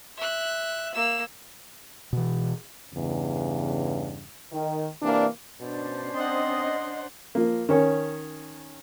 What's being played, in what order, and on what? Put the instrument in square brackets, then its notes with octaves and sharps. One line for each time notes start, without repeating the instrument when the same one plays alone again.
[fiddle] E5 F#6
A#3 E6
[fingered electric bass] B2 E3
[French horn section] E2 G2 C#3
D#3
C3 E3 A#3 D4
[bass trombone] B2 [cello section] C#4 D4 C5
[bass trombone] C4 [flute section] D#5 D#6 [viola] F#5 C6
[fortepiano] F3 A#3
D#3 C#4 C#5